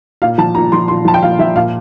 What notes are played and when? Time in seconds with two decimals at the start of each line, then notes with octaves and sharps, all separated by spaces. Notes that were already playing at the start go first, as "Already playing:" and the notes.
0.22 A#2 F5
0.38 F3 A5
0.55 A#2 A#5
0.72 F3 C6
0.88 A#2 C6
1.05 F3 A5
1.14 G5
1.23 A#2 F5
1.39 F3 E5
1.56 A#2 F5